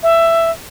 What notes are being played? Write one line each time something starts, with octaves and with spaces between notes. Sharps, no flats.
E5